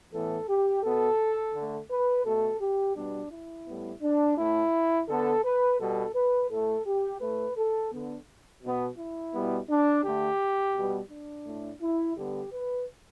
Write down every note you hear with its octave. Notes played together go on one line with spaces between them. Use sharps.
A2 E3 B3 A4
G4
B2 B3 A4
D3 A3
B4
B2 A3 A4
G4
B2 G3 B3 D4
E4
A2 G3 B3
D4
A2 A3 E4
D3 B3 A4
B4
B2 G3 B3 A4
B4
A2 A3 A4
G4
A2 A3 B4
A4
D3 B3
B2 B3
E4
B2 G3 B3
D4
D3 A3 G4
B2 G3 B3
D4
A2 A3
E4
D3 G3 B3 G4
B4